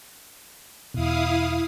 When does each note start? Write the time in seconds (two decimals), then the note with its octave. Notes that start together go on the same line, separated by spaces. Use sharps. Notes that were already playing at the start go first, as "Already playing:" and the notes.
0.94 E2 B2 E4 F5 D#6